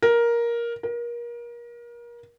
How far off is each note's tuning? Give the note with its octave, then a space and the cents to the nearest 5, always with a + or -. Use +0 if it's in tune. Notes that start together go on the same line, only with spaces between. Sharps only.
A#4 +10
A#4 +30